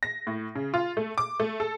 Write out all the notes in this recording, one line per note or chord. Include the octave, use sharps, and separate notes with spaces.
A#6
A2
C#3
F4
A3
D6
A3
A4